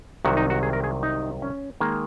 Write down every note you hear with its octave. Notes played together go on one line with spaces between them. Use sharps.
C2 C3 D#3 F#3 F#4
D#4
F#4
G#4
A#4
G#4
D#4
C#4
D#3 G#3 A#3